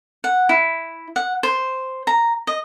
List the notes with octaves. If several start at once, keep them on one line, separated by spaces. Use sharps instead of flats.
F#5
E4
F#5
C5
A#5
D#5